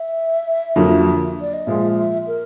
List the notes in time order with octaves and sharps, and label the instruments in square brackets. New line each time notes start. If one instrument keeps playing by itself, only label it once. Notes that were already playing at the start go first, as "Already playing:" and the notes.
Already playing: [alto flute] E5
[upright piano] F2 D3 F#3 A#3
[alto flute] D5
D#5
[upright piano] A#2 F3 G#3 [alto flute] E5
[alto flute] E5
A#4